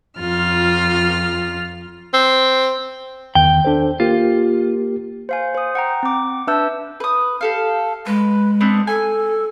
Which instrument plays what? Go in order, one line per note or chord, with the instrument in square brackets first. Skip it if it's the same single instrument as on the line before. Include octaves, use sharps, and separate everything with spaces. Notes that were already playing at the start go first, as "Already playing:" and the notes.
[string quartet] F2 F4 F6
[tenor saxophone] C4
[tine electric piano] E2 D#3 G6 [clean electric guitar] G5
[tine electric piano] D4 A4 C5
[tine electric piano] A#3 G4 A#4 [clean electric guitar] F4
[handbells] C5 F5 G#5
C5 D#6
F#5 G5 A#5
C4 D6
D4 B4 E5 A5 E6 G6
[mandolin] B4 D#6
G4 A4 F5
[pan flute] G#3 [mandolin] B4
[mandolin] B3 C4 D4
[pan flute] A4 [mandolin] G#5